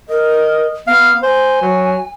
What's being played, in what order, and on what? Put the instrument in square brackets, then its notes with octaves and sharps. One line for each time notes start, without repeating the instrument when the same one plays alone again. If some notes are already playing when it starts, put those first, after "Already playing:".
[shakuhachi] A#4 [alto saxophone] D#5
[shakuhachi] B3 [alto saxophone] F5
[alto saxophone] C5 [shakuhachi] G#5
[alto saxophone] F#3